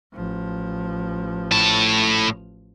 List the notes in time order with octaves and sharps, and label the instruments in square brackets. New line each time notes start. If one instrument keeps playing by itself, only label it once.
[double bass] A1 F3
[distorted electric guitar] A2 A5